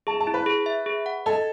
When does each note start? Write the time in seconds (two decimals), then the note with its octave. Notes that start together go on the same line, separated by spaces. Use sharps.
0.07 G#4 A5
0.20 A5
0.27 E4
0.34 B4
0.46 G#4
0.66 E5
0.86 G#4
1.06 F#5
1.26 A4 D#5